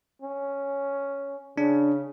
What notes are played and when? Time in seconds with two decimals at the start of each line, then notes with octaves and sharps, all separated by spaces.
0.22 C#4
1.58 C#3 D4